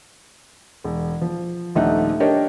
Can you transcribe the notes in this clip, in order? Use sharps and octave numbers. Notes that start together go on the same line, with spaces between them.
E1
F3
D#1 A#1 A3 D#4 E5 F#5
D4 G4 A#4 C#5 D#5 G5